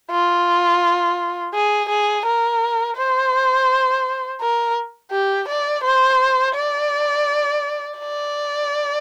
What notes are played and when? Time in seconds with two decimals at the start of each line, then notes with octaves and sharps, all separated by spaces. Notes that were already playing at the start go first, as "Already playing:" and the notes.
0.11 F4
1.55 G#4
1.90 G#4
2.26 A#4
2.97 C5
4.41 A#4
5.12 G4
5.49 D5
5.84 C5
6.55 D5
7.99 D5